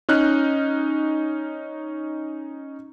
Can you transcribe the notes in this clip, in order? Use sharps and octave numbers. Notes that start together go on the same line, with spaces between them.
C#4 D#4 F6 F#6